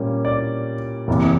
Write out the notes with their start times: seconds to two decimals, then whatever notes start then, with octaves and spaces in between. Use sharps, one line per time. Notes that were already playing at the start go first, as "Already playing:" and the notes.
Already playing: A#2 G3 A#3 C#4
0.25 D5
1.08 F#1 E2 C3 E3